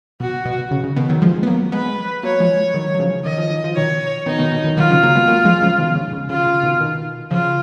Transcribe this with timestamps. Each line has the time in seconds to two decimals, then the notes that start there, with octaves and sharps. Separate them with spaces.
0.20 B2 F#4
0.45 B2
0.71 C#3
0.84 C#3
0.96 B2 D#3
1.09 D#3 F#3
1.22 F3 G#3
1.43 B3
1.47 F#3 A#3
1.72 G#3 B3 B4
2.23 F#3 A#3 C#5
2.40 F3 G#3
2.74 D#3 F#3
2.95 F#3
3.00 C#3 F3
3.26 D#3 D#5
3.38 F3
3.51 D#3
3.64 F3
3.76 B2 D#3 C#5
4.26 B2 D#3 D#4
4.39 B2 D#3
4.52 B2
4.64 B2 D#3
4.77 D#3 F#3 F4
4.90 C#3 F3
5.03 F#3 A#3
5.15 G#3 B3
5.28 F#3 A#3
5.45 F3 G#3
5.62 C#3 F3
5.79 B2 D#3
5.96 C#3
6.13 C#3
6.30 C#3 F4
6.47 C#3
6.63 B2 D#3
6.80 B2 D#3
7.31 C#3 F3 F4